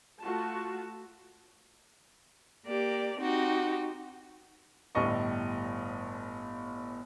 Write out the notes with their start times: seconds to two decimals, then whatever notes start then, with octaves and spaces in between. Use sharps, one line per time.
0.21 A3 F4 F#4 A5
2.66 A#3 G4 D5
3.18 C4 D#4 F#4 G4
4.95 G1 A2 G3 D#5 C#6